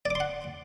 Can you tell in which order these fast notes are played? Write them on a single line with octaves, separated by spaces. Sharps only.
D5 D6 C6 F#5